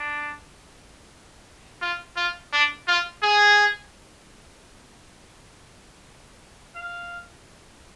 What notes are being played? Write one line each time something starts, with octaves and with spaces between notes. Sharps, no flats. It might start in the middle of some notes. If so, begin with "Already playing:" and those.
Already playing: D4
F4
F4
D4
F4
G#4
F5